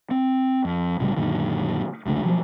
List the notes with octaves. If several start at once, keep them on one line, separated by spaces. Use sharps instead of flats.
C4
F2
C2 A2 C#3 G3
F#2 A#2 D3 D#3
F1 C#2 D3 A3
B2 F3 F#3